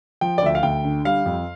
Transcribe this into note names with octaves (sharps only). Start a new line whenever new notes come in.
F3 G5
D5
D2 E5
F5
D2 G5
D3
G3 F5
F2